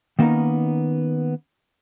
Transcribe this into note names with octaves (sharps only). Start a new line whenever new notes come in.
D#3 A#3 B3 C#4 D#4